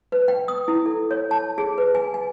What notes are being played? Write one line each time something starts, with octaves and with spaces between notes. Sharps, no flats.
B4
G5
D#6
E4
A4
C#5
A5
G#4
B4
G#5
G#5